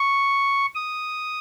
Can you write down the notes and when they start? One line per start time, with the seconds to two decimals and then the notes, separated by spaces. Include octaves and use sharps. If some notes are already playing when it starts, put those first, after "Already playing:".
Already playing: C#6
0.75 D#6